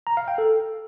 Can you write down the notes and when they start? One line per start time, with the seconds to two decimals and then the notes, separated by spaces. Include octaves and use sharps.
0.07 A#5
0.17 F5
0.28 G5
0.38 A4